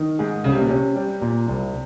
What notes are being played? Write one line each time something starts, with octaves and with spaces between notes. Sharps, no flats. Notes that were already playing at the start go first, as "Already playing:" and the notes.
Already playing: D#3
G#2 G#4
C2 C#3
C3
A#2
C3 C#4
G3
A#2
C2